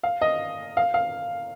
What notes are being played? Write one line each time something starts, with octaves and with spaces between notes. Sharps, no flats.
F5
D#5
F5
F5